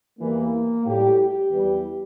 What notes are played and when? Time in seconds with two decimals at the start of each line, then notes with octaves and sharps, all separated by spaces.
0.20 E2 E3 G3 A#3
0.85 A2 G3 G4
1.18 G4
1.51 E2 E3 G3